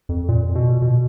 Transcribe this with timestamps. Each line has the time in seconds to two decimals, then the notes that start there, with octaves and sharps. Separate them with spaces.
0.09 F2
0.29 A#2
0.55 B2
0.82 B2